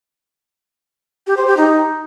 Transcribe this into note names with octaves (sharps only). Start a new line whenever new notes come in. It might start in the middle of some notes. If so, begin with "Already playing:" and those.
G4
C5
G4
D#4